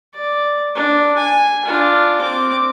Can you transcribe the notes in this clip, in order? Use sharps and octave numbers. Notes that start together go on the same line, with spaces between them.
D5
D4
G#5
D4 F4
C4 D6